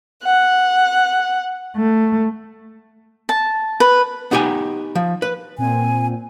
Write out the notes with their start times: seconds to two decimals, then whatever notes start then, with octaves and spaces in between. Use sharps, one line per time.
0.23 F#5
1.74 A3
3.29 A5
3.80 B4
4.31 B3 D#4 G4 G5 G#5
4.95 F3
5.22 B4
5.58 A#2 C4 G#5